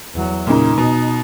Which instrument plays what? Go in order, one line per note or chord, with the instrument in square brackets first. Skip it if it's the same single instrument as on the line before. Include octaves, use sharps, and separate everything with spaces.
[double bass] E2 F#3
[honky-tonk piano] A#2 C#3 [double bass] D#4
[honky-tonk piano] B2